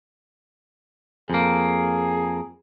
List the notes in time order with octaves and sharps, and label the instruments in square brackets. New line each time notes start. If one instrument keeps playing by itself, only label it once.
[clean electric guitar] F2 A#3 [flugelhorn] G#4